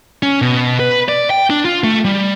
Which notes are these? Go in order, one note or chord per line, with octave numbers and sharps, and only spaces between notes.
C#4
B2
B4
D5
G5
D4
F4
A3
G3